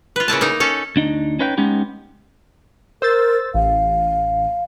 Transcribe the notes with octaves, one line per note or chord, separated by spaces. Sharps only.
F4 B4
C#3 A#3 E4 A5
A#3 D#4
C#4 A4
D2 D4 D#4
C#4 D#4 B4 C#5 F5 G5
G#3 B3 C#4 D#4 G4
A#4 C5 E6 A6
A1 F5